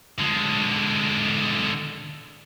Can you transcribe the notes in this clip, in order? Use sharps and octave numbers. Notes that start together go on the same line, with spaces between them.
D3 G#3